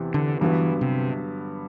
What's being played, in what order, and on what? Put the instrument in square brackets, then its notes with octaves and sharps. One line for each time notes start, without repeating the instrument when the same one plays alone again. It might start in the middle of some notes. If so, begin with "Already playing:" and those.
Already playing: [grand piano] E2 C3 E3
[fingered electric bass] D3
[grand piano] G2 D3 F#3 B3 F#4 [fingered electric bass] E3
[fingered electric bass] C3